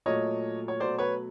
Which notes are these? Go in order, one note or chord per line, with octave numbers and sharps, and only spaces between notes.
A#2 F#3 A3 C#5 D#5
C#5
B2 F#3 A3 C5 D5
B4 C#5